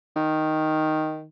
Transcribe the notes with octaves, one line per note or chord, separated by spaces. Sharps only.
D#3